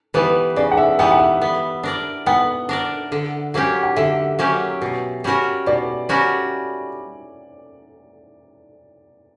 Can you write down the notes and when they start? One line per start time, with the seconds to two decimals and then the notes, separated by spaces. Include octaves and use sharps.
0.14 E3 G3 B3 B4
0.56 C#3 D5
0.72 F#5
0.77 E5
0.99 E3 G3 B3 F#5
1.11 F#5
1.20 E5
1.42 B3
1.83 D4 A#4 D5
2.26 B3 F#5
2.69 D4 A#4 D5
3.12 D3
3.54 F#3 A#3 C#4 G4
3.83 F#5
3.96 D3 E5
4.39 F#3 A#3 C#4 G4
4.82 B2
5.24 G3 C#4 F#4 A#4
5.67 B2 D5
6.09 G3 C#4 F#4 A#4